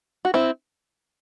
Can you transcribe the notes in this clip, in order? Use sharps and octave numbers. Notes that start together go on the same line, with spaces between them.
F#4
C4 E4